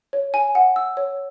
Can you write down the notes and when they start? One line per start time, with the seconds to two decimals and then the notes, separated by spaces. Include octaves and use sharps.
0.13 C#5
0.34 G#5
0.55 F#5
0.76 E6
0.97 C#5